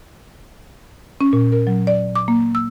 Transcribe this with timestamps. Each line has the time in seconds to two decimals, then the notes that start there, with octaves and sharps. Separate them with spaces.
1.21 C#4
1.33 A#2
1.52 A#4
1.67 F#3
1.87 D5
2.15 D6
2.28 A#3
2.55 E6